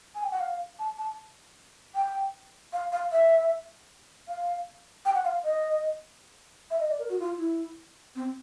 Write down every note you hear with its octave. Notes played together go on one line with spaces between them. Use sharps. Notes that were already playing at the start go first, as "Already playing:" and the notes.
G#5
G5
F#5
F5
A5
A5
G5
F5
F5
E5
F5
G5
F#5
F5
D#5
E5
D#5
D5
A#4
F#4
F4
E4
C4